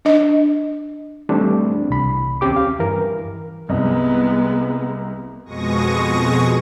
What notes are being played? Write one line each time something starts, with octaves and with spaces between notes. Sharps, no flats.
D4 D#5
E3 G3 A3 C4 D4
C2 B5
D#2 C4 C#4 G4 D6
F5
G2 E3 A#4
C2 G#3 B3 D#5
F2 B2 G#3 C#6 D#6 A#6